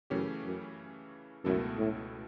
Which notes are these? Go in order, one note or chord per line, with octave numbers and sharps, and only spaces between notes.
F#2 C#3 E3 A3 C#4 G4
F#2
C#2 F#2 B2 A3 E4 A4
A2